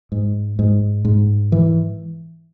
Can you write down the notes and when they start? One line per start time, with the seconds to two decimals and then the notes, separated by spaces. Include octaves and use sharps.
0.12 G#2
0.59 G#2
1.05 G#2
1.52 E3